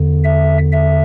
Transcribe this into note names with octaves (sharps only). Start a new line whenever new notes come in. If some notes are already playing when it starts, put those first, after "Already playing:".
Already playing: E2 D3
E5
E5